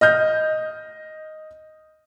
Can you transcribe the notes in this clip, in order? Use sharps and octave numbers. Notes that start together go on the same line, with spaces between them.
D#5 F6 G6